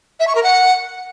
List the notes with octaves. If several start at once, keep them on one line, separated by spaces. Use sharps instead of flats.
E5
C#6
A#4
F#5